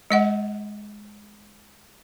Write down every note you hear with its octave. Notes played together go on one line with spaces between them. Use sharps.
G#3 D#5 F#5